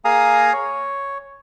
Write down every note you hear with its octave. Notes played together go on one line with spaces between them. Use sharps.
A#3 G#4 F5 G#5 A#5 D#6
C#5